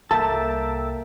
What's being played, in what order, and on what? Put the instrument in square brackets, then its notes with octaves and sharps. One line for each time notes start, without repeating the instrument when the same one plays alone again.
[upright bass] C2 G2 [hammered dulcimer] A#3 [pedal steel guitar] A4 E5 G5 [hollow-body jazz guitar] A5